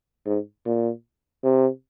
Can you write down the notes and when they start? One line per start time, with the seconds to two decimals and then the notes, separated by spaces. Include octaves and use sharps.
0.26 G#2
0.66 A#2
1.44 C3